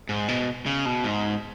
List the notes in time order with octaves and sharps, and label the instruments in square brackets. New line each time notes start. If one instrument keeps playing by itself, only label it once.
[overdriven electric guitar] G#2
B2
C#3
B2
G#2